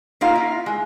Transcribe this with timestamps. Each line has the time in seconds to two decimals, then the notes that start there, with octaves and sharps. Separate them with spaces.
0.21 A#3 D#4 F4 F5
0.35 E4
0.66 G#3